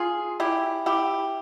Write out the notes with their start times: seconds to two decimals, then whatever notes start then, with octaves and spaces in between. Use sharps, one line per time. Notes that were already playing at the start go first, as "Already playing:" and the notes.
Already playing: F4 G#4
0.40 E4 G4
0.86 E4 G4